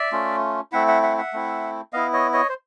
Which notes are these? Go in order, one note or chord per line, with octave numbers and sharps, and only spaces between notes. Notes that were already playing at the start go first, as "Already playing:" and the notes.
Already playing: D5 E5
A3 C#4 F4
A3 C4 E4 E5 F#5
E5 F#5
E5 F#5
E5 F#5
A3 C4 E4
B3 E4 D#5 F5
C#5 D#5
C#5 D#5
C5